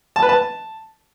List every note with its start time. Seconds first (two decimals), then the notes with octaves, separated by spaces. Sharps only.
0.16 A5
0.22 B4
0.29 A5